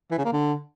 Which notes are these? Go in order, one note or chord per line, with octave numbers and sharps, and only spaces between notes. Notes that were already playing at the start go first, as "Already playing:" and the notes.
E3
C#3
A#3
D3